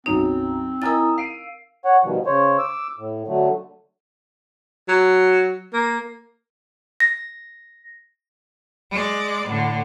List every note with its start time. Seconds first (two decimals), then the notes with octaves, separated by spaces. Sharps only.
0.06 B1 F#2 C4 D#4
0.82 E4 A#4 D#5 G#5 A#5 D#6 E6 A6
1.18 F5 C7 D7 D#7
1.85 C#5 F#5
2.03 B2 D#3 F3 G3
2.26 C#3 C5 C#5
2.58 D6 E6
2.98 A2
3.27 D3 F#3 A3
4.88 F#3
5.73 A#3
7.00 A#6
8.91 G#3 D5
9.48 A2 D3